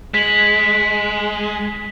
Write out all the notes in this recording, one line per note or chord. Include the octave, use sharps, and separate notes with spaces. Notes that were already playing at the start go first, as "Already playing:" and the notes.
G#3 B6 F#7